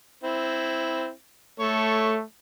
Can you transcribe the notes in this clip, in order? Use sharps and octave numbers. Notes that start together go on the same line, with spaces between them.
C4 E4
A3 A4 C#5